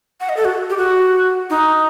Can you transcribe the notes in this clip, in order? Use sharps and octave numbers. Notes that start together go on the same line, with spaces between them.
F#5
D#5
A4
F#4
G4
F#4
D#4